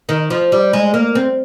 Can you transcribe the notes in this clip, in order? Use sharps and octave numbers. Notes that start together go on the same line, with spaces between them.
D#3
F3
G3
G#3
A#3
C4